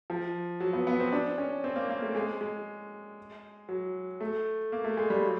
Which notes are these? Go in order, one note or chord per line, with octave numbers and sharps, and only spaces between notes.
F3
F#3
B3
B3
C4
D4
C#4
C4
A#3
A#3
A3
G#3
G#3
F#3
A3
A#3
A3
G#3
G3
F#3